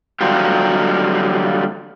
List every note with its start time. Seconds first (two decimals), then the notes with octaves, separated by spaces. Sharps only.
0.21 D3 F#3 G3 A#3 F4 G4